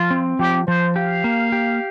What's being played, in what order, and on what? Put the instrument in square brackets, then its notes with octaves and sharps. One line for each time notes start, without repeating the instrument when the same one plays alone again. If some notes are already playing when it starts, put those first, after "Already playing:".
Already playing: [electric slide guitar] F3 [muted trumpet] F4
[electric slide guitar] C4
[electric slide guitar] F3 [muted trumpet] G4
[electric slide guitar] F3 [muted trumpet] C5
[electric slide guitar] G4 [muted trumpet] F5
[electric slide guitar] A#3
G4